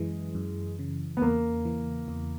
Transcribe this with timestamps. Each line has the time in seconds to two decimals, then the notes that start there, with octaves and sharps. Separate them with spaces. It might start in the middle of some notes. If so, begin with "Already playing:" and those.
Already playing: F#2 E3 G#3
0.35 F#2
0.79 C#3
1.17 B3
1.22 E2 A#3
1.65 E3
2.08 E2